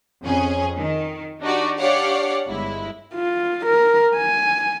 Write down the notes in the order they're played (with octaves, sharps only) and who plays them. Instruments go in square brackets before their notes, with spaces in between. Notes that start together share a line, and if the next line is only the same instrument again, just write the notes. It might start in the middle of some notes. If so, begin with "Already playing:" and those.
[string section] F2 C#4 G#4
D#3
D4 D#4 F#4 G4 D5
D4 G4 C#5 D5 F5 F#5
G1 G#3 E4
[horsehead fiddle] F4
A#4
G#5